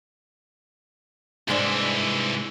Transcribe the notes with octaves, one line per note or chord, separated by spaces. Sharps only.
C2 G#2 E3 G#3 D4